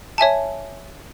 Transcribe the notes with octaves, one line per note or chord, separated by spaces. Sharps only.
C#5 E5 G#5 A5